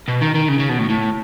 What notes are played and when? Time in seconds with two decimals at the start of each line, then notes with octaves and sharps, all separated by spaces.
0.08 B2
0.22 D#3
0.35 D#3
0.49 C#3
0.60 C#3
0.70 B2
0.79 A2
0.90 A2